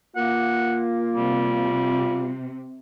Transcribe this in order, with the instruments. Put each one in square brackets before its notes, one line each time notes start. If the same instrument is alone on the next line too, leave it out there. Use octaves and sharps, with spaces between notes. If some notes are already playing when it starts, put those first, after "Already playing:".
[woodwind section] A#3 [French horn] F4 [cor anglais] F#5
[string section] C3 [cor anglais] G3